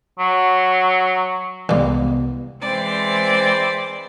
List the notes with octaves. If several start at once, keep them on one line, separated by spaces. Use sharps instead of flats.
F#3
C2 E3 G3 G#3 A#3 B3
E3 G#3 C4 C5 D5